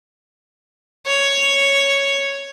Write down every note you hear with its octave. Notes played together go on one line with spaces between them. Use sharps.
C#5